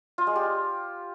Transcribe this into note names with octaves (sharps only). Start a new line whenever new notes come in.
F4
G#3
G4